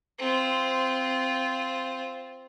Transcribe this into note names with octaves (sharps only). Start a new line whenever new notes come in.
C4 F4